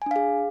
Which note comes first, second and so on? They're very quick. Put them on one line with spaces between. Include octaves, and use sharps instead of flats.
G#5 D4 F5 G#4